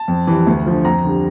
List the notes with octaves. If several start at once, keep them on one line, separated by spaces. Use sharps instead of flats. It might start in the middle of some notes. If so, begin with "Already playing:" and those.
Already playing: A5
F2
E3 G3
D2
D3 F3
F2 A#5
D3 G3